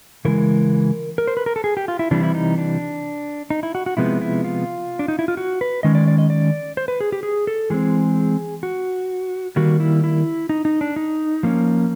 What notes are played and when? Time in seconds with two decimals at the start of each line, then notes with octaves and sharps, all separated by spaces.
0.25 C#3 E3 G#3 A#4
1.18 A#4
1.27 C5
1.37 B4
1.46 A#4
1.56 A4
1.64 G#4
1.77 G4
1.88 F4
1.99 E4
2.11 C3 E3 G3 D4
2.23 E4
2.35 D#4
2.58 D4
3.50 D#4
3.63 E4
3.75 F#4
3.86 F#4
3.97 C3 F3 G#3 B3 E4
4.21 E4
4.44 F4
4.99 D4
5.08 D#4
5.19 E4
5.28 F4
5.37 F#4
5.61 B4
5.83 D#3 G#3 C#4 D#5
5.95 D5
6.08 D5
6.18 D#5
6.30 D5
6.77 C5
6.88 B4
7.01 G#4
7.12 G4
7.23 G#4
7.47 A4
7.70 E3 G#3 C4 G#4
8.63 F#4
9.56 D#3 G3 A#3 F#4
9.80 E4
10.04 E4
10.49 D#4
10.65 D#4
10.81 D4
10.96 D#4
11.43 F3 A#3 C#4